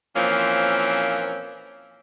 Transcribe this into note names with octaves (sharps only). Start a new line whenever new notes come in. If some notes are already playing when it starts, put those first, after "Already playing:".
A#2 E3 F3 A#3 C4 C#4